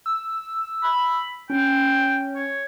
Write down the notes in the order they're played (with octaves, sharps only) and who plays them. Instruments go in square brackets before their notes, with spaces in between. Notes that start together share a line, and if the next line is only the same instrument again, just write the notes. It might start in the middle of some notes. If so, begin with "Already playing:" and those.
[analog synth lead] E6
[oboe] B5
[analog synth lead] C#4 [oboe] G5
[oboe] C#5